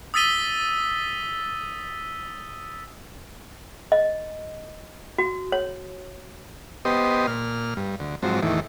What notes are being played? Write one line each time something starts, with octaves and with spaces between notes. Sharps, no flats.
D#6 E6 A6 B6 D#7 G7
D#5
F#4
C#5
B3 G4 C5 D#5
A#2 F6
G2
D2
G#2 F3 F#3 C4
E2 A2 D#3 E3